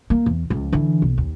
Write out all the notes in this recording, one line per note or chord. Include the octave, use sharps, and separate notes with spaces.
A#3
E2
C#2 F3
D3 E3
B1
D#2